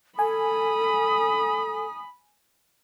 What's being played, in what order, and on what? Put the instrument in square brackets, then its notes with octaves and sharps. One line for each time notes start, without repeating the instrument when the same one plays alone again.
[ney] A4 [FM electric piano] G#5 [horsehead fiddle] B5 [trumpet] D#6